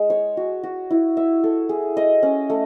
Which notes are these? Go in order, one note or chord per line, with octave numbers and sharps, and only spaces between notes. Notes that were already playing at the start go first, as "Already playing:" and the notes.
Already playing: G#3
C#5
F#4
F#4
E4
E5
A4
G#4
D#5
C#4
A3